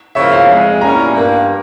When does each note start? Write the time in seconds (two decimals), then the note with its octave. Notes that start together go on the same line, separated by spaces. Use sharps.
0.15 C#3 F3 A#3 F4 E5
0.32 F5
0.48 F2 C3 F3 G#3
0.81 A#2 G3 C#4 E4 A#4 A#5
1.14 G2 G3 A#3